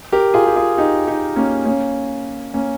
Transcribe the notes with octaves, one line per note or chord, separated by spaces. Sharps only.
G4 A#4
F4 G#4
G4
F4 G#4
D#4 G4
D#4 G4
A#3 C#4
A#3 C#4
A#3 C#4